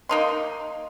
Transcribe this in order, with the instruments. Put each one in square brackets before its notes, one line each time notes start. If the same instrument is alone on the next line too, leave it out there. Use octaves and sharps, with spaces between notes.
[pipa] A#3 D#4 C6